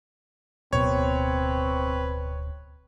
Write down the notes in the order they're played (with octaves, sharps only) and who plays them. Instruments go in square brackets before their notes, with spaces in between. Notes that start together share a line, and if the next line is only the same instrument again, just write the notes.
[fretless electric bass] D1 B2 [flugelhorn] C4 [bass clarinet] B4 [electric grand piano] C#5